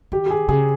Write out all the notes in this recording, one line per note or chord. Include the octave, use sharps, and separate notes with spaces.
D#3 G4
G4
G#4
C#3 G#4